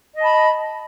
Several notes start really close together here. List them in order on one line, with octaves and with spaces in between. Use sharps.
D#5 A5 B5